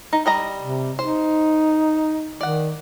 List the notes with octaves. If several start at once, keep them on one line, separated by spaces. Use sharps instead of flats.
D#4
G3 D#5 A#5
C3
D#4 C5
D#3 D5 F#5